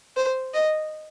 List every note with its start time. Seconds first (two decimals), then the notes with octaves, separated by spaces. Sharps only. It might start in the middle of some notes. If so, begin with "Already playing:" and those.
0.16 C5
0.53 D#5